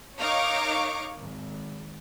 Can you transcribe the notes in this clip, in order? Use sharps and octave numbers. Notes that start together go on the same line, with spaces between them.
D#4 A#4 C#5 F5 C#6 D6
G#1